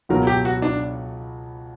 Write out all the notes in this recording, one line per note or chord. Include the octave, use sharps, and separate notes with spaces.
C#2 B2 F#3 A#4
G4
F#4
D4